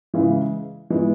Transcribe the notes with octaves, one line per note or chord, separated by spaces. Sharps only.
C#3 E3 G#3
E3 G#3 B3